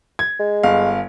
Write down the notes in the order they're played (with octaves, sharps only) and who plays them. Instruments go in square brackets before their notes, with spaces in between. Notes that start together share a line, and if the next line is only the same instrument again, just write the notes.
[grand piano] G#6
[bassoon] G#3
[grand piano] G1 F5